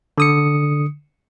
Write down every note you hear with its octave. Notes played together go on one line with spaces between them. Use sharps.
D3 D#6 C#7